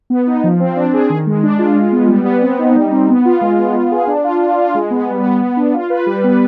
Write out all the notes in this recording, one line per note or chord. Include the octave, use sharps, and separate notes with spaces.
B3
D#4
F3
C4
D4
G#4
D#3
G#3
D4
F4
G#3
B3
G3
B3
C4
D#4
G3
C4
B3
F4
G#3
B3
F4
G#4
D4
F4
D4
F4
G#3
B3
G3
B3
B3
D4
F4
B4
G3
B3